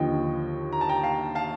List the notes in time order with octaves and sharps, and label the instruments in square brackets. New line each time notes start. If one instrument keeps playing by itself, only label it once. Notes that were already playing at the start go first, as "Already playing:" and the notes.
Already playing: [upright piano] D#2 D3 F3 [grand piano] D#5 G5
[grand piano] A#5
A5
G5 A#5
F5 A5
F5 A5